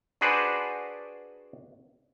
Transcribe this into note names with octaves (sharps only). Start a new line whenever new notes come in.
D4 F#4 G#4 B4 C5 D5